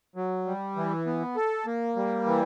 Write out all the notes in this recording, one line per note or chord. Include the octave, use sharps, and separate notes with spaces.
F#3
G3
E3
B3
A4
A#3
G3
E3